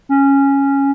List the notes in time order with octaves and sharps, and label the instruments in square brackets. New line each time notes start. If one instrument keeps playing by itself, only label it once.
[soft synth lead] C#4